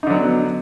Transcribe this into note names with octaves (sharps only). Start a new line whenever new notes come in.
D3 F#3 B3 D#4